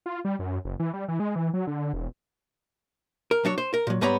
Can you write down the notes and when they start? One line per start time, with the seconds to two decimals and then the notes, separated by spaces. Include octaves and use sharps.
0.06 F4
0.25 G3
0.39 F#2
0.65 F#1
0.80 E3
0.93 G3
1.08 E3
1.20 G#3
1.36 E3
1.54 F#3
1.67 D3
1.93 E1
3.31 A#4
3.45 F#3 D4 C#5
3.58 C5
3.74 A#4
3.87 A#2 F#3
4.01 G#2 G3 B3 C#5 A#5 B5